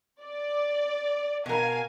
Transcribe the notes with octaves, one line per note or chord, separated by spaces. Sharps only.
D5
B2 A#4 F5 G#5